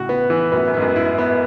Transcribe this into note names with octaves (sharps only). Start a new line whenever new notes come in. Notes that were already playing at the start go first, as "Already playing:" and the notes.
Already playing: A2 C#3 F#4
B3
E3
F#2 A2 B3
F#2
G#2 B3
F#2
E4
B3